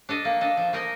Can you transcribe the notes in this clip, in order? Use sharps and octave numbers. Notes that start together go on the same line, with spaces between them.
D4 A4 D#5
A#3
D4 A4 D#5
F3
A#3 D#4 A#4 D#5